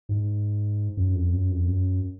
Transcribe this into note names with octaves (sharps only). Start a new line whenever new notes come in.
G#2
F#2
F2
F#2
F2
F#2